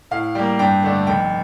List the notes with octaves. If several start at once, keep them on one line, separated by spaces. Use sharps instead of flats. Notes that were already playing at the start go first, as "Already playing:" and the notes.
A2 F5
G3 A#3 G5
G2 G5
D3 A3 D4
F1 G5